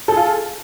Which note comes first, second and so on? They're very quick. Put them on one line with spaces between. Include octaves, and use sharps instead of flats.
A4 G#4 F4